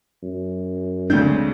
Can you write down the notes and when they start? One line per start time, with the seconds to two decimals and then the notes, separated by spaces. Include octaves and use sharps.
0.23 F#2
1.10 D2 C#3 G#3 A3 C4 D4 G6